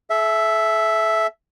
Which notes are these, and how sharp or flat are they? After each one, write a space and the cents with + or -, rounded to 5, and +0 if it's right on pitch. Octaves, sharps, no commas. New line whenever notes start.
A4 -40 E5 +0